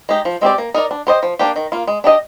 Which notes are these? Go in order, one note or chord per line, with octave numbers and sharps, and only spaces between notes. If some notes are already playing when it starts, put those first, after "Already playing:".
G#3 D#4 G4
F3
G#3 C4 G4 D5
A#3
D#4 A#4 D5
D4
G4 C5 D#5
F3
A#3 D4 G4
D#3
A#3 F4
G#3
D4 G4 C5 D#5